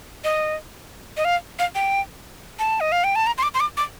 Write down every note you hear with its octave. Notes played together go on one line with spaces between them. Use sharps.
D#5
D#5
F5
F5
G5
A5
D#5
F5
G5
A5
A#5
C6
D6
C6
D6
D6